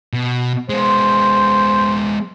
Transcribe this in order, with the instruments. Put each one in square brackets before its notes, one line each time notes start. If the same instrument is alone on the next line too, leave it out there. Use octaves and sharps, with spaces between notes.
[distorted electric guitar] B2
[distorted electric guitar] G#3 B3 [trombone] C5